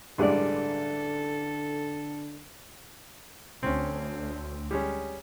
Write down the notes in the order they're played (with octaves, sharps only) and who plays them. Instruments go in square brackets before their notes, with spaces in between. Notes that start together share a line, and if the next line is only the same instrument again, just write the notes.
[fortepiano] A1 G2 G#3 [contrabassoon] D3 [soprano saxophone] A4 [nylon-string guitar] B4 D5
[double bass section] D2 [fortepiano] C4 C#4
[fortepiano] G3 G#3 C#4